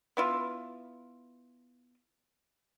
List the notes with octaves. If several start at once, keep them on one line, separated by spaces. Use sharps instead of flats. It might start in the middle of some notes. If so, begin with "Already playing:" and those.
B3 E4 F4